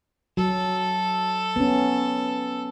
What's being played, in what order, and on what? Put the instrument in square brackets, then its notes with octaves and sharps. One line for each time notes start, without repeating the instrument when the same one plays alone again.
[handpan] F#3 [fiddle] A4
[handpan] B3 C#4